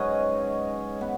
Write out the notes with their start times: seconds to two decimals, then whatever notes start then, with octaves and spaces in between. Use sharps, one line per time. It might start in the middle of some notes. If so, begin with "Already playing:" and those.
Already playing: G#2 F#3 C#4 G#4 B4 C#5 D#5
1.01 B3